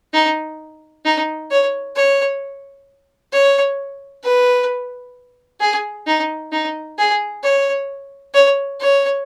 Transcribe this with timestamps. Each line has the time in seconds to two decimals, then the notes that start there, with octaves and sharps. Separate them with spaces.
0.13 D#4
1.05 D#4
1.51 C#5
1.95 C#5
3.32 C#5
4.23 B4
5.60 G#4
6.07 D#4
6.52 D#4
6.98 G#4
7.43 C#5
8.34 C#5
8.80 C#5